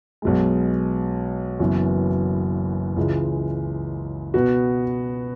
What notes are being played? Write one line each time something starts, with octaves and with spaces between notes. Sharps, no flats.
B1 B2 G#3
F#1 F#2 E3 B3 F#4
C#2 C#3 E3 G#3
B2 B3 F#4